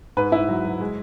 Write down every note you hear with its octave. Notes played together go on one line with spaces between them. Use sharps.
G#2 B4
G#2 E4
F#3
F#3
G#3